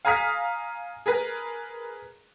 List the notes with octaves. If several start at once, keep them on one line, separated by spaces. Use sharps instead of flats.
F5 G#5 A#5 D#6 F6 B6
G#4 A#4 B4